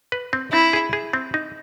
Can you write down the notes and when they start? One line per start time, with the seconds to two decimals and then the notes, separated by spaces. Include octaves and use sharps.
0.12 B4
0.33 C4
0.52 C4 E4
0.73 G#4
0.93 G#4
1.13 C4
1.34 D#4